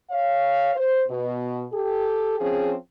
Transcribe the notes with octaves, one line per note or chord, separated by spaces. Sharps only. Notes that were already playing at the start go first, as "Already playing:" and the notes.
C#5 F5
C5
B2
G4 A4
F3 C4 C#4 G#4